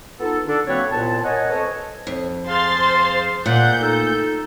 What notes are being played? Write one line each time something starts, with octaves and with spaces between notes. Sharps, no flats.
B3 D#4 F4 A4
D3 D4 A4
F#3 A#3 C4 B4 C#5
C2 A#2 B3 A5
A#4 C#5 D#5 F#5 G#5
C4 A4 B4 C#5 D#5 A5
F2
G#4 C5 F5 C6 A6
D2 A#2 D5 F#5 G6
D#4 A4